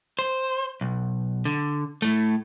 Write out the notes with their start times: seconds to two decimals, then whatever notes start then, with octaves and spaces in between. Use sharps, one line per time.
0.19 C5
0.81 B1
1.45 D3
2.02 A2 A3